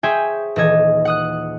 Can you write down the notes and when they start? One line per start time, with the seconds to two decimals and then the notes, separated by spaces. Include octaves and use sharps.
0.03 G#4 C5 C#5 E5 G5 G#5
0.56 D#1 E3 A4 D#5 G#6
1.05 F#5 D#6 F#6